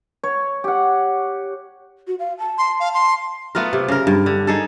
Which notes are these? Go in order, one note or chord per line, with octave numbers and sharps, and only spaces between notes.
C#5
G4 F#5
F#4
F5
A5
C6
F5
C6
A3 B3 F4 A#4
C3
C#3 A#4
G2
D3
D#4 G#4 A4